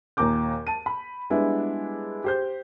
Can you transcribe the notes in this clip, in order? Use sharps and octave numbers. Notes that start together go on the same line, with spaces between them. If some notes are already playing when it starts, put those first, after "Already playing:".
D#2 A#2 A#5 D6 G6
A5 D#7
B5
G3 G#3 B3 D4 E4
G4 C5 G6